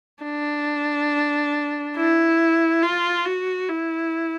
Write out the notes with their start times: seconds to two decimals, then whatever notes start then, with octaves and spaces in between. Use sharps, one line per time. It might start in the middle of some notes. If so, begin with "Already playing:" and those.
0.23 D4
1.96 E4
2.82 F4
3.25 F#4
3.69 E4